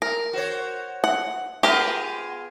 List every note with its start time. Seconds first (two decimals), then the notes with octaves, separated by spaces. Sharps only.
0.02 A#4
0.33 F#4 C5 C#5
1.04 F#5
1.63 B3 F4 G4 G#4 A#4